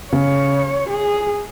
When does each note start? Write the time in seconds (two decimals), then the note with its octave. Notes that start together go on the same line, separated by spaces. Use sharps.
0.12 C#3 C#5
0.90 G#4